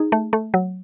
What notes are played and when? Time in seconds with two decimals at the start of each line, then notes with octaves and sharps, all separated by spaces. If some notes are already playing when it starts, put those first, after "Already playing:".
Already playing: D#4 G#4
0.12 A3
0.33 A3
0.54 F#3